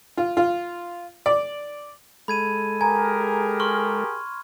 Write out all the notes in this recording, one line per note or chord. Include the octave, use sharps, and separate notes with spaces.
F4
F4
D5
G#3 A4 B5 G#6 D#7
G4 G#4 A#4 G#5 A#5 G#6
C6 C#6 F6